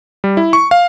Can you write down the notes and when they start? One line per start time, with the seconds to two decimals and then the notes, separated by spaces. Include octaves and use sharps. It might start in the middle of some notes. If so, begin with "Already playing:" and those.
0.24 G3
0.37 E4
0.53 C#6
0.71 F5